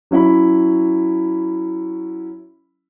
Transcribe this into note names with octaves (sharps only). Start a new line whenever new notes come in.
F#3 C#4 E4 B5